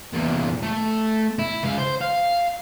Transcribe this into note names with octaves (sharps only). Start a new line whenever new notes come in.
E2 A#2
A3
E4
C#2 F5
C5
F5